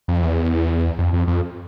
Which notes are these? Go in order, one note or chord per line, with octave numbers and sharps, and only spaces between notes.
F2
E2
F2
F2
F2